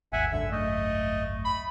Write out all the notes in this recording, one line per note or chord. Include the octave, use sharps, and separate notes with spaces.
G#1 D#2 E5 F#5 G#5
G#1 C#2 F#2 D3 E5
A3 D#5
B5